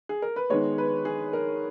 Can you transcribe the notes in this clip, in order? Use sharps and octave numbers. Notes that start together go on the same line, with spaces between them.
G#4
A#4
B4
D#3 G#3 B3 C#5
B4
G#4
A#4